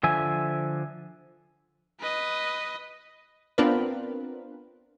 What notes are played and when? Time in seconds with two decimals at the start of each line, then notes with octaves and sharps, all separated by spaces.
0.03 D3 F3 E5 G#5
1.99 B4 D#5
3.58 B3 C4 D4 F4 A#4 B4